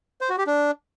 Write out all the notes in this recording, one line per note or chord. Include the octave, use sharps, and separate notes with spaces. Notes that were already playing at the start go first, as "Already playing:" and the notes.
C5
F#4
G4
D4